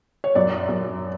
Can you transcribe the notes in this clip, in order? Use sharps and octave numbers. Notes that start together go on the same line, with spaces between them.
C#5
F#2 D5
F#2